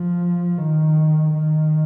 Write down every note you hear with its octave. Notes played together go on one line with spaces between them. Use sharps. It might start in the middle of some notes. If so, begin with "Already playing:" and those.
Already playing: F3
D#3
D#3